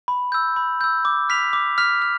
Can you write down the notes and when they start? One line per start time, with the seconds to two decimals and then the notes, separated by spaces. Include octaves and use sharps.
0.08 B5
0.32 E6 G6
0.56 B5
0.81 E6 G6
1.05 D6
1.29 F6 B6 F7
1.53 D6
1.78 F6 B6 F7
2.02 F6